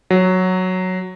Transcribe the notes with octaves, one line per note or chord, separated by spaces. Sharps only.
F#3